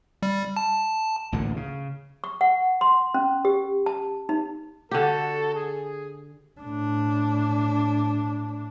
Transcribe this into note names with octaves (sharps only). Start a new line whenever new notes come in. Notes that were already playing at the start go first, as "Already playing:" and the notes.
G3
A5
A1 D2 A#2 D3
C#3
C#6
F#5
C6
C#4
G4
A5
D#4
D3 F#4 G4 A4
G#4
A2 D4